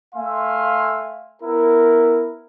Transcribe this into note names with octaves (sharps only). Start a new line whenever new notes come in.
A3 E5 F5 G#5 C6
B3 E4 A#4